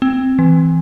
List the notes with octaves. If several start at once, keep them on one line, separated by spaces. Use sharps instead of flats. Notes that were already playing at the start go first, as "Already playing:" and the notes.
C4
E3